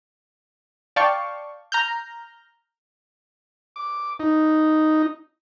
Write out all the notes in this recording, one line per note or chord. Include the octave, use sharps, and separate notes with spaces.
D5 F5 G5 A5 C#6
A#5 F6 G6
D6
D#4